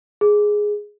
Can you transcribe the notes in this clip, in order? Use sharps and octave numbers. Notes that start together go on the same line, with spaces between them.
G#4